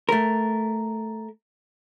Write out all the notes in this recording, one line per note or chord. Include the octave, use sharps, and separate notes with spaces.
A3 A#4